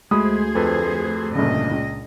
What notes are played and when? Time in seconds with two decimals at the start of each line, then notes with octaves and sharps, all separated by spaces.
0.11 D2 G#3 A3 F#4 G#4 C5 B5 D#6
0.55 F2 A4 B4
1.35 G1 A#2 C#3 D4 D#5
1.71 C#2